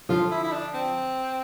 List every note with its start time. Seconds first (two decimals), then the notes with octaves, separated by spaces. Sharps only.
0.09 D3 F3 F4
0.31 E4
0.43 E4
0.52 D4
0.74 C4